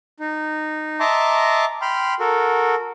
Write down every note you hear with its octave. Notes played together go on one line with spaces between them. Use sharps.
D#4
D#5 E5 A5 A#5 C6 D6
G5 B5 C6 F6
F#4 A4 A#4